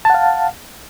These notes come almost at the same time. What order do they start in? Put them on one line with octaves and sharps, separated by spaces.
A5 F#5 F5